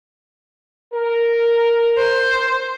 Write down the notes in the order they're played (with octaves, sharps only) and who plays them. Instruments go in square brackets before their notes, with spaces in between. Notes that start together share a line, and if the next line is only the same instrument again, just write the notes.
[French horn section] A#4
[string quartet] C5